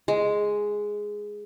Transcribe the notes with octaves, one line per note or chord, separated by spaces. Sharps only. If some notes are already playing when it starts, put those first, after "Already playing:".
G#3